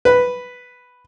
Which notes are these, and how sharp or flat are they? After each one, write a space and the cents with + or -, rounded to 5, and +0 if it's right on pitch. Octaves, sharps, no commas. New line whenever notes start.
B4 +0